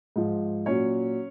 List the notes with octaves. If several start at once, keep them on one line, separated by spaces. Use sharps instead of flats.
G#2 F3
A#2 F#3 C#4 C#5